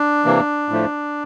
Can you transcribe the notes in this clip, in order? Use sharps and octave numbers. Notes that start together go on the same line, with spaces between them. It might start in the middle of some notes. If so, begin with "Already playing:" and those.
Already playing: D4
C3 E3 A#3
A2 F3 A3